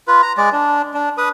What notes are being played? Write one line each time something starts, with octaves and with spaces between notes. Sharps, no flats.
F4 B4
A#5
G#3 D5
D4
D4
B4 D#6